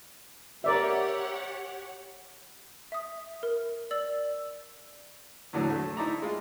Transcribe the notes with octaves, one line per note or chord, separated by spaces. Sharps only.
G4 A#4 C#5 D5 E5 F#5
E5 D#6
A#4
D5 E6 F#7
E2 A2 D3 F#3
A3
D#4 E4 D5 A#5
G#3 F4